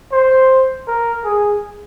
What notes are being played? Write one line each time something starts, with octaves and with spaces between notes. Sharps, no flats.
C5
A#4
G#4